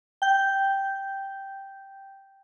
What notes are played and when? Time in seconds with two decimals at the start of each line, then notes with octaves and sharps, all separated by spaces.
0.22 G5 G6